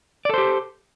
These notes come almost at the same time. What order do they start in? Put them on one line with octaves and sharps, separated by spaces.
D5 A4 C5 G4